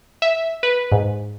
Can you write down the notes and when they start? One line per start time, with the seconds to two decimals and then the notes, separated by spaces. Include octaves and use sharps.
0.22 E5
0.63 B4
0.92 G#2